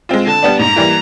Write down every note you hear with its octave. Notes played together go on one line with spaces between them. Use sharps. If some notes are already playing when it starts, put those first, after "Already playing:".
G#3 C4 F4
D3 A5
G3 B3 D4
G#2 A#5
E3 G3 A#3